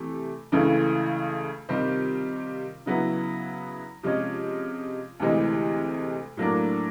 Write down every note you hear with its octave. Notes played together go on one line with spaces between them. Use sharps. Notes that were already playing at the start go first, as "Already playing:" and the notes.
Already playing: C3 E3 A3
C#2 C#3 E3 A3
C3 D#3 G3 C4 F4
C#3 F#3 B3 E4
C3 F3 G#3 C#4
D2 C3 E3 G#3
A2 F#3 A#3 D4